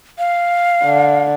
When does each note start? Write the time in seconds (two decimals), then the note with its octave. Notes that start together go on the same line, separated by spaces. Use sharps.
0.18 F5
0.84 D3